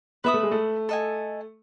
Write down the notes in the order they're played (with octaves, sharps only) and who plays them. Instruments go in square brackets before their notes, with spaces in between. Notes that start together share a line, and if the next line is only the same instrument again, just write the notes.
[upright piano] B3 [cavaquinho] B4 E5 B5 D#6
[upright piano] A3
G#3
A3
[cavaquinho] A4 D#5 G#5